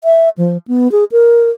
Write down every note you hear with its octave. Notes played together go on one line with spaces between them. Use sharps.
E5
F3
B3
G#4
A#4